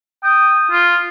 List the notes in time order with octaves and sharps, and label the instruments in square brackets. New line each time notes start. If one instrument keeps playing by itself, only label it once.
[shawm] G5 [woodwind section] D#6
[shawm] F4